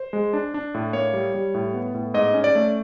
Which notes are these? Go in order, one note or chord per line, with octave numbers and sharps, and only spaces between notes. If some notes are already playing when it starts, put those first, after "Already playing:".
Already playing: C5
G#3
D4
D4
A2
A#3 C#5
G3
G3
A2
B3
A2
G#2 D#5
C#4
D5
A3